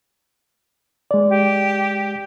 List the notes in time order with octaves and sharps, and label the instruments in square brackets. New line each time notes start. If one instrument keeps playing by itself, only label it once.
[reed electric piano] G#3 D5
[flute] G4